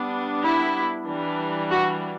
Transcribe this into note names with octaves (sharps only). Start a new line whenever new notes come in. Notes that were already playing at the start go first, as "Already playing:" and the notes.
Already playing: G3 B3 D4
E4
E3 G3 D4
F#4